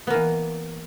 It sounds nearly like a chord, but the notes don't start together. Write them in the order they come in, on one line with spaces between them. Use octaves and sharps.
B3 A#3 E3